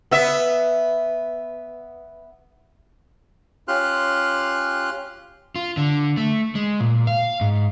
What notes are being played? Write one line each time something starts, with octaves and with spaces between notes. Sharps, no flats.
B3 E5
C#4 F4 G4 C6 F6 F#6
F4
D3
A3
G#3
A#2
F5
G#2